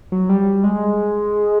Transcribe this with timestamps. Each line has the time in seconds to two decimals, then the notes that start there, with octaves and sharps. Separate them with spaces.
0.12 F#3
0.29 G3
0.64 G#3